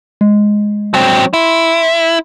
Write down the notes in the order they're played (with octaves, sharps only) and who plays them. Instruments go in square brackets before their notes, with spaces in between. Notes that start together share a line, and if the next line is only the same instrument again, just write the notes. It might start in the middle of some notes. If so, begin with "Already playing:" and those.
[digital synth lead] G#3
[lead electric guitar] F#3 C4
[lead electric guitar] E4 [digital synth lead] C6